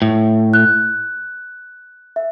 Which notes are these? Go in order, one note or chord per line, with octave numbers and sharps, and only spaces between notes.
A2
F#6
E5